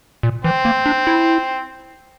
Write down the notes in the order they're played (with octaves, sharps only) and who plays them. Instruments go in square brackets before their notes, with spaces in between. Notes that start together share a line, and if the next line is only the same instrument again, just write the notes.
[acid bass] A#2
[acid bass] E3 [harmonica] C4
[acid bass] A#3
D4
E4